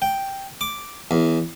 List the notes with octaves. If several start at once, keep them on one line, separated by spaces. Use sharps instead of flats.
G5
D6
E2